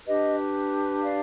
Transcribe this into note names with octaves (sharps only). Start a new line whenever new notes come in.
D4 G4 B4 D#5
D5 F5